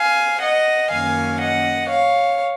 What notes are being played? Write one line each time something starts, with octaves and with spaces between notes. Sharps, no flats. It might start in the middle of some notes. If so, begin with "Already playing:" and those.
Already playing: F5 G#5
D#5 F#5
F#2 D#3 A#3 C#4 F5 G#5
D#5 F#5
C#5 F5